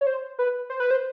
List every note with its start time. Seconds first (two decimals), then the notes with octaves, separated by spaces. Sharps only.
0.01 C#5
0.07 C5
0.39 B4
0.70 C5
0.80 B4
0.91 C5